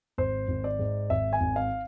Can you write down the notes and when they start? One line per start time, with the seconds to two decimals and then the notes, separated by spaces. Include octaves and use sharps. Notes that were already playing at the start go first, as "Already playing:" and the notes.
0.18 G#1 C5
0.48 G#1
0.64 D5
0.79 G#2
1.10 G#1 E5
1.33 G#5
1.41 G#1
1.56 F5